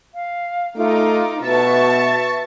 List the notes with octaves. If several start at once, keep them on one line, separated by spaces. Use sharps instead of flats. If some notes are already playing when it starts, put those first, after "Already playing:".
F5
A3 D#4 F4 D6
B2 E5 A5 C#6 A6